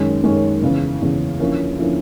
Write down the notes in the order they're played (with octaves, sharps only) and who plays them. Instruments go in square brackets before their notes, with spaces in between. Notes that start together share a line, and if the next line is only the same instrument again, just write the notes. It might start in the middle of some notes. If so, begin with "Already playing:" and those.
Already playing: [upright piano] F#2 D#3 G#3 C#4
F#2 D#3 G#3 C#4
E2 C#3 E3
E2 C#3 E3
D3 F3 A#3 C#4 E4
D3 F3 A#3 C#4 E4